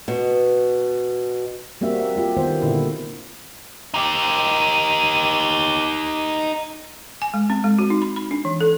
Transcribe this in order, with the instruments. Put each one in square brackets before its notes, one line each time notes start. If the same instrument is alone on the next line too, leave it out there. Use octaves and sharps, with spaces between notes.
[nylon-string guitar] B2
[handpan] G3 A#3 C4 F#4 E5
E5
G3 F4 G4
D#3 G3 B3 C5
A#2 D3 E4
[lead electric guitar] D#4 G4
[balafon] G#5
G#3
C4
G#3
F#4
D#4
B5
B5
D4
E3
A4